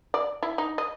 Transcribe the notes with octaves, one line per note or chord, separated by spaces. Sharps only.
D5
E4
D#4
D#5